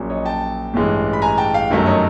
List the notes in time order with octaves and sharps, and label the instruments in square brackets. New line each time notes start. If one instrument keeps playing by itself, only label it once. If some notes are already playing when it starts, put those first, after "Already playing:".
Already playing: [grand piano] A#1 A#2 F#3 A#3 C#4
C#5 D#5
G5 A5
A1 G2 E3 G#3
B5
G#5 A#5
G5 A5
F5 G5
G1 F#2 D#3 F#3 A3
C#5 D#5